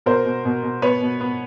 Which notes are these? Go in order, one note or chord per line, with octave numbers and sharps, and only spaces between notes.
B2 A#4 C5
B2
B2
B2
B3 B4 C#5
B2
B3